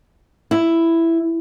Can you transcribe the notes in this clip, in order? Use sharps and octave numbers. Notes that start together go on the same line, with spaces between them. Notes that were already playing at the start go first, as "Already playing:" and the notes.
E4